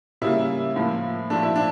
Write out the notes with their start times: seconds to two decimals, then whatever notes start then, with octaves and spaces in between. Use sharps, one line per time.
0.22 C#3 G3 A#3 E4
0.76 A2 F3 A#3
1.30 A#2 F3 A3 D4
1.43 E4
1.56 D4